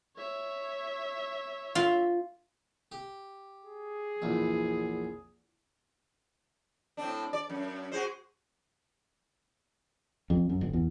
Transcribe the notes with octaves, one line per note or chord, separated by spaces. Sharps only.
C#5 E5
F4
G4
G#4
A#1 E2
A2 C4 D4
D5
F#2
F#4 G#4 C5
F2
F#2
G1
E2